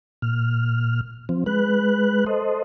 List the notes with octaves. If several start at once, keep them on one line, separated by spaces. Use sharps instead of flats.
A#2 F6
F3 C4
G#3 B4 F#6
A4 C5 D#5